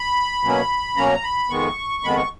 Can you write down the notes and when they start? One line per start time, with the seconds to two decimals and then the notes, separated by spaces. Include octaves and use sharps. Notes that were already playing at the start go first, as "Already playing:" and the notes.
Already playing: B5
0.43 B2 F#3 A#3 C#4
0.96 B2 F#3 A#3 C#4 A#5
1.23 B5
1.50 F2 D#3 G#3 B3 C#6
2.03 F2 D#3 G#3 B3 B5
2.16 C#6